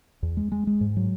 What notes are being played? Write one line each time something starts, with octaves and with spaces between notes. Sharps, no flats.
E2
G#3
G#3
G#3
G#2
F#3